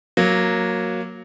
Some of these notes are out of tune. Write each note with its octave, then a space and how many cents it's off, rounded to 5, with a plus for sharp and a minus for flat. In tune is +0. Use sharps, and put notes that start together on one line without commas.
F#3 -10 A#3 +0